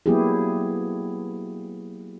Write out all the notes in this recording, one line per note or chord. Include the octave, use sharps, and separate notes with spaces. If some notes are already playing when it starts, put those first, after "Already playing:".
F#3 A#3 B3 E4 G4 G#4